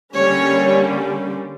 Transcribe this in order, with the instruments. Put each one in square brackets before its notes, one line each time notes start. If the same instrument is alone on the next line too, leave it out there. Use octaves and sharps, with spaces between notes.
[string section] D3 G3 A#3 C#4 C#5